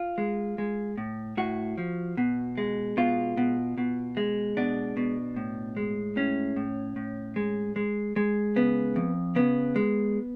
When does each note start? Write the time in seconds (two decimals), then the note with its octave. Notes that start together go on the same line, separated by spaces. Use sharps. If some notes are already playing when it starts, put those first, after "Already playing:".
Already playing: F4
0.18 G#3
0.58 G#3
0.98 A2
1.37 A2 F#4
1.78 F3
2.17 B2
2.58 G#3
2.97 B2 F4
3.37 B2
3.78 B2
4.17 G#3
4.57 B2 D4
4.97 B2
5.36 A2
5.77 G#3
6.16 A2 C#4
6.56 A2
6.96 A2
7.36 G#3
7.76 G#3
8.16 G#3
8.56 C#3 B3
8.96 F2
9.36 C#3 B3
9.76 G#3